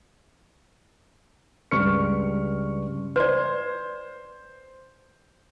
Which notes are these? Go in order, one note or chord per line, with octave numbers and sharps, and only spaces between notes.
C#2 G2 C#6 F6 C#7
B4 C5 D5